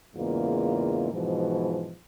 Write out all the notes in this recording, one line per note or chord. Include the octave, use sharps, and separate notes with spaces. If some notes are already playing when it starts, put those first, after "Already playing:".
E2 G#2 C#3 A#3 F4
G#2 B2 E3 F3